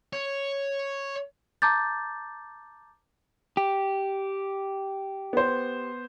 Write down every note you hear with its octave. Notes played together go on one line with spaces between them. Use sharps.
C#5
A5 A#5 D6 G6 A6
G4
B3 C5